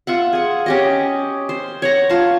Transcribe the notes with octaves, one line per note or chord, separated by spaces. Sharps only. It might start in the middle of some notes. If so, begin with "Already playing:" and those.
F4 E5 F#5
G#4 F#5
C#4 G4 D#5
C5 C6
C#5 F#5 A#5
F4 A5